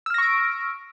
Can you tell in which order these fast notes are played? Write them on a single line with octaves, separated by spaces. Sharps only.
E6 F6 A#6 C#6 D7